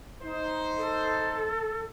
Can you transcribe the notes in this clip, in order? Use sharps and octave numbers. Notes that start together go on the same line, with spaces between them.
D#4 C5
A4